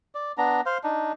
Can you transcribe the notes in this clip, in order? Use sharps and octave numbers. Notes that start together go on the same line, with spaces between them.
D5
B3 D4 A#5
C5 F5
D4 D#4